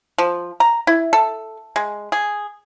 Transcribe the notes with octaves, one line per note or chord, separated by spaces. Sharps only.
F3
A#5
E4
A4
G#3
G#4